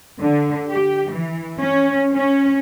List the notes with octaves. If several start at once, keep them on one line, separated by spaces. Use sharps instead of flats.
D3
G4
E3
C#4
C#4